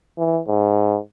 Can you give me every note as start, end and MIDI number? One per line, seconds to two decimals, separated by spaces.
0.18 0.39 52
0.48 0.98 44